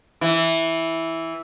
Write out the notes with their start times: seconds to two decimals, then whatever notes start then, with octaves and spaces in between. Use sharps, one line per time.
0.21 E3